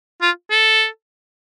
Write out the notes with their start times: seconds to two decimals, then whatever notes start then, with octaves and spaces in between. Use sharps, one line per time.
0.22 F4
0.51 A4